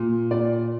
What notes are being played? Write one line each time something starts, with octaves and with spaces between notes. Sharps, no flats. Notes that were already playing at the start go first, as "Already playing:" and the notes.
Already playing: A#2
A#2 D5